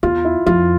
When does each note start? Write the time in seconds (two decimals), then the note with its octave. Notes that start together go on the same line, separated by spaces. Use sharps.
0.03 E2 F4
0.25 E4
0.46 F2 F4